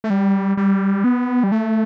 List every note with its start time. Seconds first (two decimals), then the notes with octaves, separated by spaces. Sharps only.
0.04 A3
0.10 G3
0.57 G3
1.04 B3
1.43 G3
1.52 A3